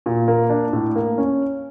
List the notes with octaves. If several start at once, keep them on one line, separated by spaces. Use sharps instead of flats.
A#2
A#3
D4
A2
A#3
C#4